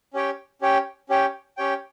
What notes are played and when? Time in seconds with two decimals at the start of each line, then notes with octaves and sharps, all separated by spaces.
0.13 C#4 G4 C#5 G5
0.61 C#4 G4 C#5 G5
1.09 C#4 G4 C#5 G5
1.57 C#4 G4 C#5 G5